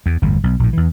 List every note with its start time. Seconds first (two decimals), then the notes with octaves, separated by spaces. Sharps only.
0.06 E2
0.22 G1 E2 A2
0.43 B1
0.59 A#1 A2
0.73 E2 E3